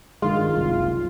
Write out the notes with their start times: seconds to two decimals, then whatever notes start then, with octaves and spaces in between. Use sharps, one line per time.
0.22 G2 D#3 G#3 F4
0.56 F#1 C2